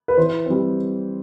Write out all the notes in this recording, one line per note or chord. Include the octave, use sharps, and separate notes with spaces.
B4
E3 C5
G3 C4